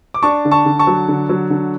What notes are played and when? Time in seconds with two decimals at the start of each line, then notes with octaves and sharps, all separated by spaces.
0.14 D6
0.23 D4 A5 C#6
0.45 D3
0.51 A5 C#6
0.66 D3
0.79 A5 C#6
0.87 F#3
1.08 D3
1.29 F#3
1.50 D3